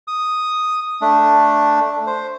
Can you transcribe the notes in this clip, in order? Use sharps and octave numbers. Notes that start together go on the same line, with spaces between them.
D#6
A3 D4
C5